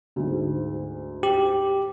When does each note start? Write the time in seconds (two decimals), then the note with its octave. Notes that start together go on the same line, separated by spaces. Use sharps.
0.16 D2 G#2
1.23 G4